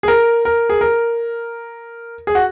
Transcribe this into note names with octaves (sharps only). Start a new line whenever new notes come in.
G#4
A#4
A#4
G#4
A#4
G#4
F#4